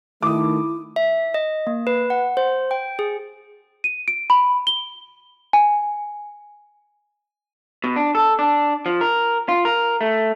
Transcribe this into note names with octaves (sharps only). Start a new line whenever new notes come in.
D#3 A3 E4 D6 D#6
E5
D#5
A#3
B4
F#5
C5
G5
G#4
D#7
D7
B5
G7
G#5
B2
D4
A4
D4
F3
A#4
F4
A#4
A3